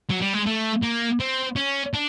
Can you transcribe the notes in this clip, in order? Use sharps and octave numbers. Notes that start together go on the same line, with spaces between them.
F#3
G3
G#3
A3
A#3
C4
C#4
D4